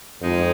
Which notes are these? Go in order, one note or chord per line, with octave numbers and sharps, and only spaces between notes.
F2 G#3 D#4